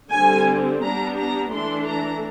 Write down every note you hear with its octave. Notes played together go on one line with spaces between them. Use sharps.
D3 G3 C4 G#5
G3 B3 D4 A#5
A#5
E3 A3 D4 C6
A#5